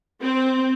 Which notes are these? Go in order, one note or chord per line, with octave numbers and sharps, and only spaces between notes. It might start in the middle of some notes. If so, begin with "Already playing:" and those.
C4